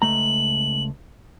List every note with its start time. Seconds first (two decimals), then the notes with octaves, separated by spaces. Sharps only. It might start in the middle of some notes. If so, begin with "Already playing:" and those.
0.02 C#2 A3 A#5 F#7